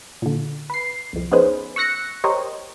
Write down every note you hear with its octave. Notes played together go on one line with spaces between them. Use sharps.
A#2 D3
B4 C7
C2 F2
B3 C#4 D#4 G#4 B4 C5
C#6 E6 F#6 A#6 C#7
G4 A#4 C5 C#5 D#5